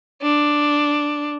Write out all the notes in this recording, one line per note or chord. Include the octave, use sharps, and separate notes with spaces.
D4